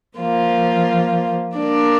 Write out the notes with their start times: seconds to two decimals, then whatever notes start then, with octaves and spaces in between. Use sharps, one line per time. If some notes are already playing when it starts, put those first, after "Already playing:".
0.16 F3 A#3 F4 C5
1.57 A#3 D4 A#4 D5